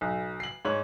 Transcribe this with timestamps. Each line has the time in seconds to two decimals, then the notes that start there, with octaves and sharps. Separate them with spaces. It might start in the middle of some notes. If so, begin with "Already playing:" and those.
0.01 B1
0.40 C7 F#7
0.65 G#2 C#5 F#7